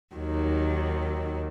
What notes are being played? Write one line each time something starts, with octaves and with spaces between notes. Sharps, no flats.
D#2 D#3 F#3